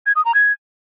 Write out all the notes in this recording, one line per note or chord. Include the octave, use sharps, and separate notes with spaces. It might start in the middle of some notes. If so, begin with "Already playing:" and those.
G#6
D#6
A#5
G#6